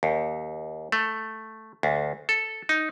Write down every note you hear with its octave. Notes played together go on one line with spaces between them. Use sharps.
D#2
A3
D2
A4
D#4